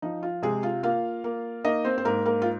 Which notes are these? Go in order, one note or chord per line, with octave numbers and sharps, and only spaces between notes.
F3 D#4
F4
C3 G#3 G#4
F4
A#3 F4 F5
A#3
A#3 D#4 D#5
C4 C5
C5
G#2 A#3 A#4
A#3 A#4
F4